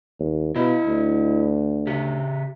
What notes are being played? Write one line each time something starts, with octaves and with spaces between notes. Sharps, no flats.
D#2
B2 E4 D#5
D2
C#3 G4